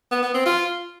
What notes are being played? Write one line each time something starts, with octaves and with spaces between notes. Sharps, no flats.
B3
B3
C4
F4